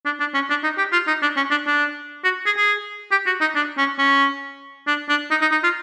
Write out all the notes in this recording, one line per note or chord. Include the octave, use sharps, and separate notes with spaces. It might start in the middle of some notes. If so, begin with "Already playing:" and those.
D4
D4
C#4
D4
D#4
G4
F4
D#4
D4
C#4
D4
D4
F#4
G#4
G#4
G4
F#4
D#4
D4
C#4
C#4
D4
D4
D#4
D#4
D#4
F4